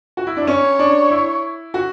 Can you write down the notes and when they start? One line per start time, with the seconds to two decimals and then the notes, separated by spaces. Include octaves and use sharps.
0.17 F#4
0.27 E4
0.37 D4
0.47 C#4 C#5
0.79 D4
1.11 E4
1.74 F#4